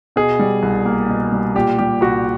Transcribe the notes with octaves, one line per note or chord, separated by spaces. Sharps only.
B2 G#4
G3
C2
A#3
B2
G3
A#2 G4
G3 G4
C2 F#4